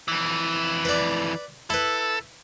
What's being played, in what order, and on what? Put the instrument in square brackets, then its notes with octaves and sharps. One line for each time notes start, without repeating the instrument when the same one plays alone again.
[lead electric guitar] F2 E3
[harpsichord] B4 D5
[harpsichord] E4 B4 [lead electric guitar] A4